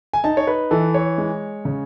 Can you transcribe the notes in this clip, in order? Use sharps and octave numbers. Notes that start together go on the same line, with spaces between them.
G#5
D#4 A5
C#5
B4
E3 A4
C#5
G#3
C#3